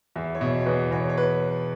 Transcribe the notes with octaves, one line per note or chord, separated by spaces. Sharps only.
E2 E5
C#5
B2 E5
C#5
E2 B4
E2 C#5
C#5
B4